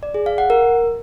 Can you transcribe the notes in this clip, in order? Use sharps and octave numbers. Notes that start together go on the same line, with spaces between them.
D5
G#4
F5
F#5
A#4